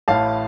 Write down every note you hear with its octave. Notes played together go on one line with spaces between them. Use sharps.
A1 A2 F5 A5